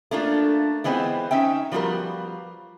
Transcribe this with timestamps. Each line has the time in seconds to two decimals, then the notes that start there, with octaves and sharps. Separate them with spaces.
0.11 A3 A#3 D4 F4
0.84 E3 G#3 B3 C4 F4
1.31 C#4 D#4 E5 G5
1.72 F3 G3 B3 F4 F#4 A#4